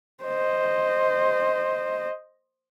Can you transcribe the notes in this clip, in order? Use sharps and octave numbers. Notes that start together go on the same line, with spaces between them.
C5 D#5